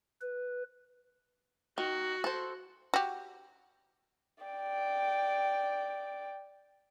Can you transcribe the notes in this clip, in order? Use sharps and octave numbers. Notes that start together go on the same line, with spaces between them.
B4
D#3 F#4
A4 C5
F#4 G4
D5 G5